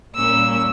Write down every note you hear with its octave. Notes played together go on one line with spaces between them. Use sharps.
A#2 G3 A#3 C#4 E6